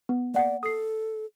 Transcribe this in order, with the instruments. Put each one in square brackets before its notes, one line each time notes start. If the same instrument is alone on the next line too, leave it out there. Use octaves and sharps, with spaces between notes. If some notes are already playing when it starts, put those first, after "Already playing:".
[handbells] B3
[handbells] A#3 F#5 [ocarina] D5
[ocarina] A4 [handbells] D#6 C7